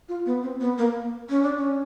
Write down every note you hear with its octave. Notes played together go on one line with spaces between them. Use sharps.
F4
B3
C4
B3
A#3
C#4
D4
C#4